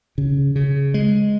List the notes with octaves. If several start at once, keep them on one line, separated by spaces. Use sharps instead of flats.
C#3
C#3
G#3